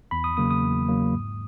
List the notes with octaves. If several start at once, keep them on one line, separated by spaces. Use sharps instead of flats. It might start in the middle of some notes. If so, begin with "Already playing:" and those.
E2 B5
D#6
C#3 F#3 A#3 D#6
D#6
E2
C#3 F#3 A#3
G#2